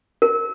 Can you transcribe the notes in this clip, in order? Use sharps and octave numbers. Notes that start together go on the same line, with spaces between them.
A#4